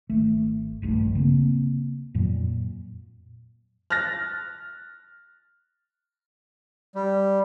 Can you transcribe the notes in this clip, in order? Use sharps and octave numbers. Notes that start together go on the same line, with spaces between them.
G#1 A3
D#1 A#1 G2 A3
C#3 A#3 C4
F2 A#2 F#3
F6 F#6 A6 A#6
G3